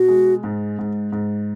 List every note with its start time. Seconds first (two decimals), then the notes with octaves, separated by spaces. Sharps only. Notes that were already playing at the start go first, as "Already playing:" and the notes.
Already playing: B2 F#4
0.08 G#3
0.44 G#2
0.79 G#2
1.12 G#2